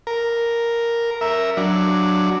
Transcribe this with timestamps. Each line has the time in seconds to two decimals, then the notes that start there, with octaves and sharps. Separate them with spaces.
0.07 A#4
1.21 A#4 E5
1.57 F#3 D4